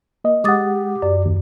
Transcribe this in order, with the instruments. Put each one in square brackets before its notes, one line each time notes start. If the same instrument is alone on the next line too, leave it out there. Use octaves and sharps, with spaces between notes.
[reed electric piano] A#3 D#5
[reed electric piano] G#3 F#5 [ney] G4 [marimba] D6 D#6 A6
[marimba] F#2 [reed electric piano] D5
[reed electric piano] D#2